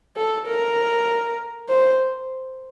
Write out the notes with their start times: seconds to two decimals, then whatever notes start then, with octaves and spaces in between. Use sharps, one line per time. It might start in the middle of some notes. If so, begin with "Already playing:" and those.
0.17 A4
0.47 A#4
1.69 C5